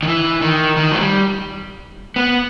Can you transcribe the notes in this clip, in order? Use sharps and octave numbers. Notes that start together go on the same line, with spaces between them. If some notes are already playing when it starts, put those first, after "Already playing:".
D#3
E3
D#3
D#3
F#3
G3
B3